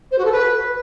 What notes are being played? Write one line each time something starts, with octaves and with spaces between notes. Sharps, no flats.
C5
F#4
A4
B4